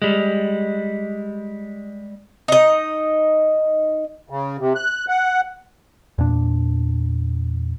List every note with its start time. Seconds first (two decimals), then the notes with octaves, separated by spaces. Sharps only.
0.02 G3 G#3
2.48 D#4 D#5
4.30 C#3
4.60 C3
4.75 F#6
5.09 F#5
6.18 E2 A#2 D4